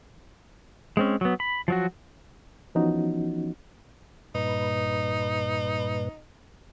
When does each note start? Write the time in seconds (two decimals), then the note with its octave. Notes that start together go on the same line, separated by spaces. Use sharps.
0.97 G#3 C4 C#4
1.21 F#3 B3
1.40 B5
1.68 F3 F#3 F#4
2.75 E3 F3 B3 C#4 D#4 F#4
4.35 G2 A#2 D#4 B4